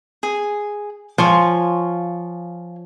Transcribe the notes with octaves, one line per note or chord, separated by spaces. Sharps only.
G#4
F3 F4 C#5 G#5